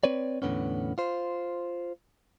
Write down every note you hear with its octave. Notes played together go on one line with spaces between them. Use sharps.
C4 B4 C#5 D5
E2 A2 D3 B3 C#4
F4 C5